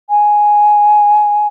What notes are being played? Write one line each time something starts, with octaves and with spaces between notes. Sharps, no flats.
G#5